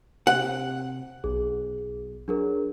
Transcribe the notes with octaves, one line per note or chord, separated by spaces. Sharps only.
C3 F#5
B1 G#4
F#3 D4 G#4 A#4